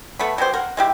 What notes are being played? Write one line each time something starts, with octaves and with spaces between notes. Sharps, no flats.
A3 B3 B5
F#3 B3 G4 C5
A#4 F#5
G#3 E4 G4